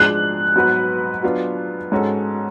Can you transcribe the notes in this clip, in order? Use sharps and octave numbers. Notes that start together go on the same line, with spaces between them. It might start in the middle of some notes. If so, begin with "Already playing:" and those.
Already playing: G#2 F3 G#3 D4 G#4 F#6
G#2 F#3 B3 F#4 B4
F#3 B3 D4 F4
G#2 G#3 C#4 F#4 A4